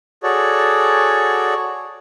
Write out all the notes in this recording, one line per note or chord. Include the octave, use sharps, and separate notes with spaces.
F#4 G#4 A4 C#5 D5